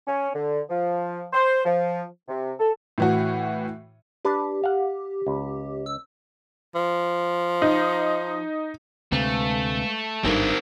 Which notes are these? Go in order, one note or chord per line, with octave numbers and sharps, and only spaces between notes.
C#4
D3
F3
C5
F3
C3
A4
A2 E3 F#4
D4 G4 B4
F5 F#5
C#2
E6
F3
D#4
D2 C3 G#3 A3 B4 F5
G#1 G2 C4 D#4 A#4